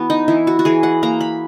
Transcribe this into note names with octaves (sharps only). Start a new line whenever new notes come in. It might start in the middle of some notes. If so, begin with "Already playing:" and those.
Already playing: E3 B3 F#4
D#4
E3 E4
F#4
F#4
E3 G#4
F#5
A#3 A#5
B5